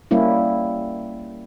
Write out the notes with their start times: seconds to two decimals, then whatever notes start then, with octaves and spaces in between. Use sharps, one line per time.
0.11 G3 A#3 C#4 E4